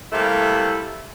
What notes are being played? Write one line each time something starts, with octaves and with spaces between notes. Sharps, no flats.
C3 G3 A3 A#3 E4 A4